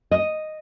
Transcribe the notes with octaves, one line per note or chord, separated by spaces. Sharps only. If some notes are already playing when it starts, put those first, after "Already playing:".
D#5